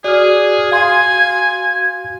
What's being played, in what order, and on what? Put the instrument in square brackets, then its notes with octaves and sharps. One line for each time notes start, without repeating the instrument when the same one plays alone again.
[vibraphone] F#4 [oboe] G#4 [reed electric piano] D5 F6
[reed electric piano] F5 C6 [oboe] G#5 [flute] G#6